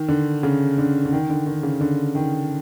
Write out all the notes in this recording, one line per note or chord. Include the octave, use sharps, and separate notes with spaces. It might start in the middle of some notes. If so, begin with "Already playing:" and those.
Already playing: D#3
D3
C#3
D3
D3
D#3
D3
D#3
C#3
D3
D#3